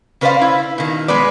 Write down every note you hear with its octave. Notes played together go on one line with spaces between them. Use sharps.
C#3 C#4 B4 C5 D5 F5
E4
B2 D#3
G#3 B3 B4 D5